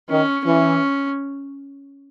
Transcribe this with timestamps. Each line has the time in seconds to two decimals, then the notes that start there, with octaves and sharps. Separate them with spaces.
0.09 D#3 C#4
0.45 E3 C#4